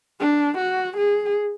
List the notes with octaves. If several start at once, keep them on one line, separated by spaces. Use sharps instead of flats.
D4
F#4
G#4